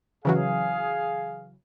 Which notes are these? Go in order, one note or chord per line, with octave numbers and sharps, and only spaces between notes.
C#3 E3 F#3 G#4 F5